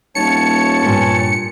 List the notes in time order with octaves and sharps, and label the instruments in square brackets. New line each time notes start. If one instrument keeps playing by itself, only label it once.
[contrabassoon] D#1 [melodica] C#5 A5 [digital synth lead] C#7
[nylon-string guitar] G2 A#2 G#5